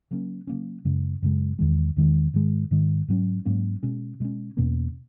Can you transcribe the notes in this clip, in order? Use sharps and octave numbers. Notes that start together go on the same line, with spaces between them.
C#3 F#3 A#3 C#4
C#3 F#3 A#3 C#4
F#2 C#3 G#3
F#2 C#3 G#3
E2 D#3 G#3
E2 D#3 G#3
G#2 D#3 G#3
G#2 D#3 G#3
G#2 F#3 A#3 C#4
G#2 F#3 A#3 C#4
B2 G#3 C#4
B2 G#3 C#4
E2 B2 A#3 C#4